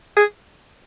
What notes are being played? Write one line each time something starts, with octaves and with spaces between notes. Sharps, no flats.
G#4